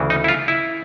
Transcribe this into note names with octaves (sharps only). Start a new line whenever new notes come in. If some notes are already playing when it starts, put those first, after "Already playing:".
Already playing: D2 C#3 E3
D#4
E4
F4
E4